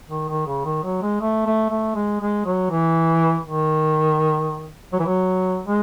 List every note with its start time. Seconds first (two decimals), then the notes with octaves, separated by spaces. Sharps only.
0.10 D#3
0.29 D#3
0.47 C#3
0.65 D#3
0.84 F#3
1.02 G#3
1.21 A3
1.46 A3
1.70 A3
1.95 G#3
2.21 G#3
2.46 F#3
2.70 E3
3.44 D#3
4.93 F#3
4.99 E3
5.06 F#3
5.66 G#3